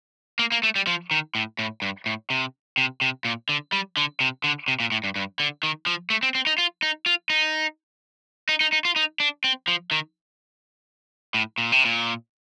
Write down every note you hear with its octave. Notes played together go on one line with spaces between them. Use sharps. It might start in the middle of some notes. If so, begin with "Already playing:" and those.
A#3
A#3
A3
G3
F3
D#3
A2
A2
G2
A2
C3
C3
C3
A#2
D3
G3
D3
C3
D3
C3
A#2
A2
G2
G2
D3
D#3
F3
A3
C4
C4
D#4
F4
D#4
F4
D#4
D#4
D#4
D#4
F4
D#4
D4
C4
F3
D#3
A2
A#2
C3
A#2